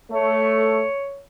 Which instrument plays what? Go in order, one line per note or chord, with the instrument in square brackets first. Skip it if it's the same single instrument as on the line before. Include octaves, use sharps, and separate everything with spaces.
[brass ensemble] A3 [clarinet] C#5